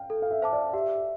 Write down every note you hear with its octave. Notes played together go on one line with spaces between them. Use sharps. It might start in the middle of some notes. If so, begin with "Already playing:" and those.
Already playing: F5 G5
A4
F5
E5
C5 F5 A5 D6
D5
G4 E5